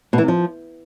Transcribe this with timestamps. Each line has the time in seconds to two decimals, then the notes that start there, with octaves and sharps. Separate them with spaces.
0.13 B2
0.18 E3
0.23 C3
0.28 F3